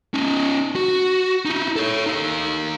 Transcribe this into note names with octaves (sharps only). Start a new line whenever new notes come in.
C#4 D#4
F#4
D#4 E4
A4 C#5
D#4 F5